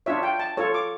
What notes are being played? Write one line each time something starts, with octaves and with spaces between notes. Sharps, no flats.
D4 F4 C#5 E5
G5
A5
F4 A4 C#5
D6